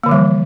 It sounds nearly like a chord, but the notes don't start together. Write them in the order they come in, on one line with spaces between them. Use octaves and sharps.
A#3 D3 F3 G3 E3